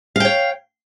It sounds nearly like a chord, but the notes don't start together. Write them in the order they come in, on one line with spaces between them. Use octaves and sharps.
F5 G5 C#5